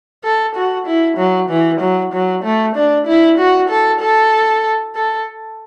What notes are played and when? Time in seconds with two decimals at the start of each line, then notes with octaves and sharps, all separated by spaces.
0.24 A4
0.55 F#4
0.86 E4
1.18 F#3
1.49 E3
1.80 F#3
2.13 F#3
2.44 A3
2.76 D4
3.07 E4
3.38 F#4
3.69 A4
4.01 A4
4.95 A4